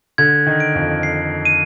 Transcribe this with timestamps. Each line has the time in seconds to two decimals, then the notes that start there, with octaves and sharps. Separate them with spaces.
0.18 D3 G#6
0.46 D#3
0.60 D7
0.75 F2
1.03 C7
1.45 D#7